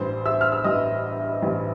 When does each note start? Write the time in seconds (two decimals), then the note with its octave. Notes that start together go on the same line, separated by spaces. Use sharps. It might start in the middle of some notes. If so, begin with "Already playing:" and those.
Already playing: A1 G2 E3 C5 C6
0.26 E5 E6
0.41 F6
0.52 E6
0.64 A1 G2 E3 D#5 D#6
1.42 A1 G2 E3